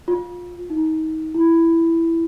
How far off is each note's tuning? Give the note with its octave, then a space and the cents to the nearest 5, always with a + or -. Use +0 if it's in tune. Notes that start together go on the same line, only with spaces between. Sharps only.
F4 +20
D#4 +25
E4 +5